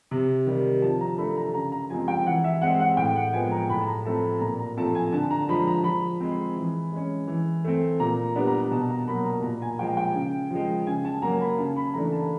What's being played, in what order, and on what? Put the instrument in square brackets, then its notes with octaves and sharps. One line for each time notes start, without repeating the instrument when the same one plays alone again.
[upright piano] C3
D#3 G3
F3 A5
A#5
A3 D4 B5
A#5
C#3 A#5
A#5
F3 G#3 C4 G#5
G5
E3 F#5
E5
G#3 C4 F#5
F#5
A2 G5
F#5
F3 G#3 B3 G#5
A#5
A2 B5
A5
A#5
F3 A3 C4 A5
A#2 A#5
A#5
F3 A3 C4 A5
G#5
D3 A5
A#5
F3 G#3 B5
A#5
F3 B5
G#3 C4
E3
G#3 C#4
E3
A3 C4
A#2 A#5
G3 B3 D4
A#5
B2 A5
A#5
F#3 A#3 B5
A#5
A#2 A#5
G#5
F3 G#3 G5
G5
C#3
F3 G#3
C#3 G#5
A5
F#3 A#3 A#5
B5
C#3 A5
B5
E3 A3 D4 A#5
A5